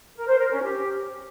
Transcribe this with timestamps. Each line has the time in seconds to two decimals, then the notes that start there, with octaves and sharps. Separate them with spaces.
0.15 A#4
0.27 C5
0.39 A#4
0.50 C#4
0.62 G4